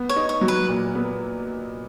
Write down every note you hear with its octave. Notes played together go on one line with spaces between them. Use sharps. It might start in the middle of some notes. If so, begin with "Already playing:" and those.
Already playing: B3
C#5
D#4
C#5
F#3
B4
A#2
B3